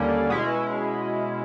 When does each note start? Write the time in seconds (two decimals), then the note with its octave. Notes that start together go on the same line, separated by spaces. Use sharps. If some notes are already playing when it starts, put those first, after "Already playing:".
Already playing: D#2 D3 G3 A#3 C#4
0.30 B2 G#3 C#4 E4